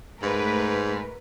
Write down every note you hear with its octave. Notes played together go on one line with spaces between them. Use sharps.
G#2 A3 A#4 B4